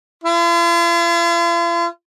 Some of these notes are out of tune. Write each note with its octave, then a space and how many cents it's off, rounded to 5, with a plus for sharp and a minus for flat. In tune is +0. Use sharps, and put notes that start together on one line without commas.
F4 -45